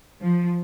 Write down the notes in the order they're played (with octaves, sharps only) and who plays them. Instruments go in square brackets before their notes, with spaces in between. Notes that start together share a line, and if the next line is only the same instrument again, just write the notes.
[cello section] F3